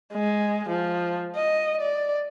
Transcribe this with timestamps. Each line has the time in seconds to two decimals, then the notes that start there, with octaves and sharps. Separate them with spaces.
0.14 G#3
0.69 F3
1.36 D#5
1.81 D5